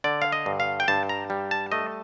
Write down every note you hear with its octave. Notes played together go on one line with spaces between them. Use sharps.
D3 D5
F5
D#5
G2
F5
G5
G2 A5
A#5
G3
A5
A3 D#5